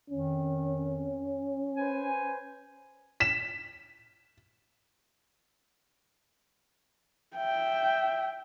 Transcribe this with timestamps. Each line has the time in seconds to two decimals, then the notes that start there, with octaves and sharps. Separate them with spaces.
0.10 F2 D#3 C#4
1.77 B4 C5 G#5
3.20 B6 E7
7.37 E5 G5